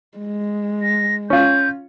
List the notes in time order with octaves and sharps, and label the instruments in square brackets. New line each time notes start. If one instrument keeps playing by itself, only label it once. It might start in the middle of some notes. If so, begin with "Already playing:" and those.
[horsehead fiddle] G#3
[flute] A#6
[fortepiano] C#4 F4 [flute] G6